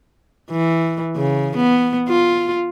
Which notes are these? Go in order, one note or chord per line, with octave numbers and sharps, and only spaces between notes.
E3
C#3
B3
F4